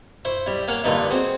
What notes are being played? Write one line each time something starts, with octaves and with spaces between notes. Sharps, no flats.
E4 C5 C#6
G3 E4
A#3 C#5 F5 F#5 G#5
G2 A#2 D3 E3 D#4 E4
C4 F#4 G#4